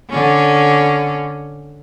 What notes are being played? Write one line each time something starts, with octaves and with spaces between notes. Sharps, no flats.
D3 C#4